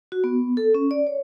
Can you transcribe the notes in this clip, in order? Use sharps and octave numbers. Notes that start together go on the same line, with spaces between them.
F#4
B3
A4
C#4
D5
C#5